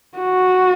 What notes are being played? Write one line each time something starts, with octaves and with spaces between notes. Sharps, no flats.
F#4